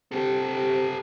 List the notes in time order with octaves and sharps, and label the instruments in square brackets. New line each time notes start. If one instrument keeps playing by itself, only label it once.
[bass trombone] C3 [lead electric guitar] G4 A4